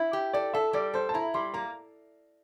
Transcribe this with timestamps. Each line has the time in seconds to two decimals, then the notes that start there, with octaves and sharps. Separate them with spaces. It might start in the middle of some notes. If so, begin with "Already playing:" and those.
Already playing: E4
0.13 G4
0.33 A4 D5
0.54 A4 E5
0.73 G3 D5
0.94 A4 C5
1.09 A5
1.14 E4 A#5
1.34 G3 C6
1.54 A#3 A#5